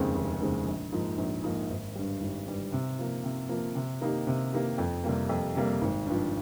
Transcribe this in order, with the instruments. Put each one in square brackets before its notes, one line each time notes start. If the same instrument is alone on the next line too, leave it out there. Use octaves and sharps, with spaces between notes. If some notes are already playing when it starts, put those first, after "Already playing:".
Already playing: [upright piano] F1 D#2 C#3 G#3 C4
F1
D#2 C#3 G#3 C4
A#1
G#2 F3 A#3 D#4
A#1
G#2 F3 A#3 D#4
G#1
G2 G3
G#1
G2 G3
C3
F3 A#3
C3
F3 A#3
C3
D#3 A#3 D#4 G4
C3
D#3 A#3 D#4 G4
F2
C3 G3 A#3
F2
C3 G3 A#3
G#1
G2 F3